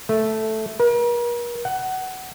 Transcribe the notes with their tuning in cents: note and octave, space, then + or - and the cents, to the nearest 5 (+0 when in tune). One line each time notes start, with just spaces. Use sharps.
A3 -5
A#4 +45
F#5 +20